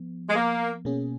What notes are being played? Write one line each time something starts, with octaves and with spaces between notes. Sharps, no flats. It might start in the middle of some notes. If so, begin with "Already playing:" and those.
Already playing: F3 B3
G#3
A#3
B2 A#3 C#4 G#4